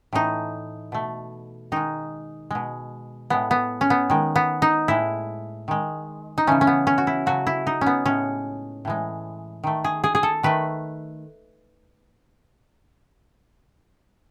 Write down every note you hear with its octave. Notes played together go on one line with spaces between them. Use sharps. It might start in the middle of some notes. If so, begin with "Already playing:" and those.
A2 E3 A3 D#4
B2 A3
D#3 G#3 D#4
B2 G#3
A2 G#3 B3
B3
C#4
B3
D#3 G#3
B3
D#4
A2 G#3 E4
D#3 G#3
D#4
C#3 E3 A3 C#4
C#4
B3
C#4
F#4
E4
C#3 F#3 A3 F#4
E4
D#4
C#4
B3
A2 G#3 C#4
A2 E3 G#3
D#3 A3
G#4
G#4
G#4
A4
D#3 A3 B4